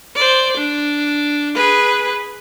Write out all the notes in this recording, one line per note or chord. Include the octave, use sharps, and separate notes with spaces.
C5 D5
D4
G#4 B4